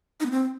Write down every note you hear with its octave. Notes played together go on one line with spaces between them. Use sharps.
D#4
B3
C4